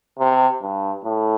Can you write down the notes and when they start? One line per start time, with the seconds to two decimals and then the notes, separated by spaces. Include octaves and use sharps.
0.19 C3
0.62 G2
1.04 A2